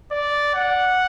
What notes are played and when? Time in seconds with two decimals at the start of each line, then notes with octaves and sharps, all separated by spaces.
0.12 D5
0.54 F#5